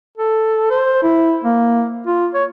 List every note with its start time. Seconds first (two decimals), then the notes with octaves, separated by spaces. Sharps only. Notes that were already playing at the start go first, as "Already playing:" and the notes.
0.17 A4
0.70 C5
1.02 E4
1.44 A#3
2.07 F4
2.34 C#5